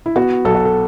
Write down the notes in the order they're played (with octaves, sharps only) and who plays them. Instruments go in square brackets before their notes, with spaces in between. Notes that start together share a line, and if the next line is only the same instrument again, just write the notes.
[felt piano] E4
B3 F#4
B1 A4
F#4
A4